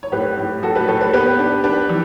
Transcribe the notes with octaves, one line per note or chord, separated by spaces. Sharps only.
C#5
A2 G4 B4
A2
A2 F#4 A4
G4 B4
A2 A4 C#5
G4 B4
B3 G4 B4
D4
D4 G4 B4
E3